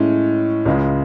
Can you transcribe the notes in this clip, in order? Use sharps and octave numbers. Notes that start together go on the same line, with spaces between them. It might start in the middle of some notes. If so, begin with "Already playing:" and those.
Already playing: A2 G#3 C#4
C#2 C#3 G#3